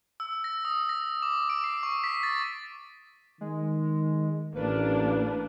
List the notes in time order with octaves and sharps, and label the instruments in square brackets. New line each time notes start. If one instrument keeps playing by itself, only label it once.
[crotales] E6
A#6
D#6
A#6
D6
D7
C7
C#6
B6
A6
[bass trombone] D#3 [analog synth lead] G#3
[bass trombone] A1 [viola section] A#3 D4 [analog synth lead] B4